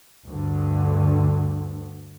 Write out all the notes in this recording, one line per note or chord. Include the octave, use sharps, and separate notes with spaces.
D2 G2 D3